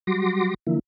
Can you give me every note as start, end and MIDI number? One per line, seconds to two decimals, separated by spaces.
0.07 0.54 54
0.07 0.54 55
0.07 0.54 66
0.07 0.54 84
0.07 0.54 86
0.07 0.54 94
0.67 0.79 50
0.67 0.79 52
0.67 0.79 53
0.67 0.79 58
0.67 0.79 64